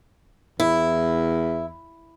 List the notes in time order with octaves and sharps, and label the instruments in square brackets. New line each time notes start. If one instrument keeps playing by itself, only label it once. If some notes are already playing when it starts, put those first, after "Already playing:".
[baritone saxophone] E2 [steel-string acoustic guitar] E4